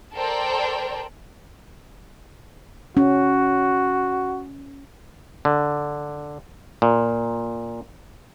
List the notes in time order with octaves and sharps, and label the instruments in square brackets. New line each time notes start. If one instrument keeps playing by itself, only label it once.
[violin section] A4 A#4 C5 D5 G5
[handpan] C#4 [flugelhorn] F#4
[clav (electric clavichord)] D3
A#2